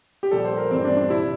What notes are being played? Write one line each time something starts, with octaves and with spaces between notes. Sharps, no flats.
G4
A#1 A#2 G3 A4
C5
A#4
A1 G2 E3 G3 C4
D4
D4
C2 A#2 G3 E4